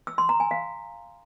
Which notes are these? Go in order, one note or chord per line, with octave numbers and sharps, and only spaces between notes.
E6
C6
A#5
G#5
F5